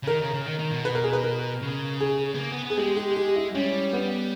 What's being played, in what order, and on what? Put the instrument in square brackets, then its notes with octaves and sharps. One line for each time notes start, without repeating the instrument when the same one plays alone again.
[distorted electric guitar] C#3
[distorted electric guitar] D#3 [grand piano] A#4
[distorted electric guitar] C#3
C#3
D#3
D#3
B2
[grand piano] B4
A#4
G#4
B4
A#4
[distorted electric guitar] C#3
[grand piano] G#4
[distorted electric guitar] B3
A#3
B3
B3
[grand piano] G#4
[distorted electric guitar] G#3 [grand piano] G4
[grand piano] G4
G4
E4
[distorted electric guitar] G3 [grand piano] C#4
[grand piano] B3